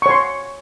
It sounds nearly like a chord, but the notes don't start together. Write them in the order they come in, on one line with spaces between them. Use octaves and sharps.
C#6 C#5 C6